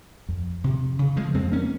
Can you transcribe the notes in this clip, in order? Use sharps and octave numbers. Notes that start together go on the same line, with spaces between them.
F2
C3
C#3
F3 G#3
F2 G#3 C4
A#3 C#4